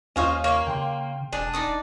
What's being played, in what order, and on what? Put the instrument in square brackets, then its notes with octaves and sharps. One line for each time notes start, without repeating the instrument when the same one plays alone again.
[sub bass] D#2 [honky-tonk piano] C#4 F4 F6 [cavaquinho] C5 C#5 D#5
[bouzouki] A#3 [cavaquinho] C#5 F5
[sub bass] C#3 [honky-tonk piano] G5 C6
[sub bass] E1 [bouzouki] D4 [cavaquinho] G#4
[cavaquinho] D#4 D5 D#6